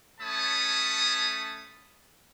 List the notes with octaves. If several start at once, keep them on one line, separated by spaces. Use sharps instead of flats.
A3 C#4 C#5 A5 B5 D#6